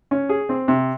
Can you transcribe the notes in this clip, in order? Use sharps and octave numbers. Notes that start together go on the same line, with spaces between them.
C#4
G#4
C4
C3